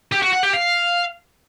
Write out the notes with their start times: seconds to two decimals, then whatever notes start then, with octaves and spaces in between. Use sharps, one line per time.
0.12 G4
0.22 F#4
0.32 F#5
0.43 G4
0.53 F5